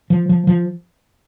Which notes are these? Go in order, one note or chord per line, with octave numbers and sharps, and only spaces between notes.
F3
F3
F3